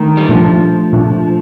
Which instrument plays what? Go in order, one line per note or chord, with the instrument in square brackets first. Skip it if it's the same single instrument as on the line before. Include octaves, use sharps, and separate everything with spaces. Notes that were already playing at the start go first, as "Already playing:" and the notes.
Already playing: [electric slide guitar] D#3 [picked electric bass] A3 D4
[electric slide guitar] G3
[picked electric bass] A#2 A3 D4 [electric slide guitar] F3
[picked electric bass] A#2 A3 D4